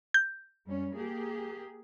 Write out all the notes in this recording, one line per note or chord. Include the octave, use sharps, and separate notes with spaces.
G6
F#2 G3 C#4
A#3 G4 G#4